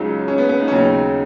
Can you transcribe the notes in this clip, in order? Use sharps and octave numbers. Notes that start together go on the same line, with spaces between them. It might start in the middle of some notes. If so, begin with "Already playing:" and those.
Already playing: C#2 C#3 F#3 D#4
C#4
B3
B3
D#4
C#4
D#2 C#3 F#3 D#4